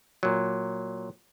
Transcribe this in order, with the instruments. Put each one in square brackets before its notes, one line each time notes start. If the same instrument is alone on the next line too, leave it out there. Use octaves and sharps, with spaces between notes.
[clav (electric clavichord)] A#2 F#3